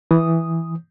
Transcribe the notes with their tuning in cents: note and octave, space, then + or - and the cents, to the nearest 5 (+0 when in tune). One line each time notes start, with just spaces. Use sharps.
E3 +0 D#6 +0